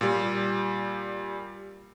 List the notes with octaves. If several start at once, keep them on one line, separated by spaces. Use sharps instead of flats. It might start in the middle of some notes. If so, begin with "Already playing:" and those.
A#2 G3